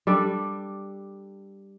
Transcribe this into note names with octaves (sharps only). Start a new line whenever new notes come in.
G3 D4 A4